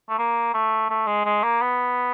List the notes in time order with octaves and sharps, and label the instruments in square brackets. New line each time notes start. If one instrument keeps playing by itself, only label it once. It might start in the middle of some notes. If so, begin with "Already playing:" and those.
[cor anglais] A3
A#3
A3
A3
G#3
G#3
A#3
B3